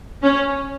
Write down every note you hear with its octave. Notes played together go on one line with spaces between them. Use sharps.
C#4